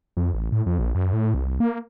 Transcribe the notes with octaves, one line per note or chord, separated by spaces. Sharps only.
F2
A1
A2
F2
A#1
F#2
A2
C2
A#3